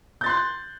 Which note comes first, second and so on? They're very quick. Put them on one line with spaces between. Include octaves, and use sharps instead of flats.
G6 A6 C6 F#6